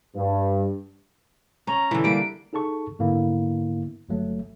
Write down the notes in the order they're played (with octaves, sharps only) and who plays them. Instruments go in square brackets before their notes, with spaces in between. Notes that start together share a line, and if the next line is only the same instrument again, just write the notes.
[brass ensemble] G2
[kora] C#4 [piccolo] A#5
[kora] D3 E3
[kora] G3 A#3 [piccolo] D7
[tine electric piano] D#4 G#4 A4 A5 C#6
G#2 D3 A#3 B3 E4
G1 F#3 A3